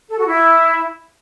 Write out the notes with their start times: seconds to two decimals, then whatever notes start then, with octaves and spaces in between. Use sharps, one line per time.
0.10 A4
0.19 F#4
0.28 E4